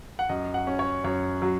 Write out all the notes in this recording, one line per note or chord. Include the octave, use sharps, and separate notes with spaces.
F#5
F#2 D#5
F#5
C#4
C#5
F#2 C#5
F#3